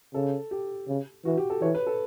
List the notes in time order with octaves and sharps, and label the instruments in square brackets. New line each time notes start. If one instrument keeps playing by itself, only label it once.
[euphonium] C#3 [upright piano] A4
[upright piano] G4
[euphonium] C#3
[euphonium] E3 [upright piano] F#4
[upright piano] G4
A4
[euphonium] E3 [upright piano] C#5
[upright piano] B4
A4